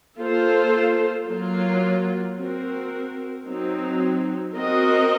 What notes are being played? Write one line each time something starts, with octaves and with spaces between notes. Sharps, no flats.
A#3 F4 A4 C5
F#3 A#3 F4
C4 F#4 A#4
F#3 C4 D#4
C4 F#4 A#4 D#5